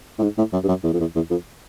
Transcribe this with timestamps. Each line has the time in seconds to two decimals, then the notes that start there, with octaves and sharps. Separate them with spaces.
0.19 A2
0.23 G#2
0.38 A2
0.53 F#2
0.64 G2
0.69 F#2
0.84 E2
0.94 F2
1.00 E2
1.16 E2
1.31 F2